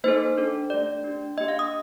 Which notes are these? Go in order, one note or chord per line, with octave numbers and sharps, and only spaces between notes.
A#3 D#4 A4 C5
D4 A4
A3 D4 G4 D5
D4 G4
A#3 D4 G4 D#5
F5
D#6